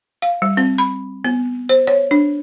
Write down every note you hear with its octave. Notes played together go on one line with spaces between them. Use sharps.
F5
G3
C4
B5
B3
C5
C#5
D4